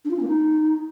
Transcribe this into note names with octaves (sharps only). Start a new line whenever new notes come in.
D4
F4
C#4
A#3
D#4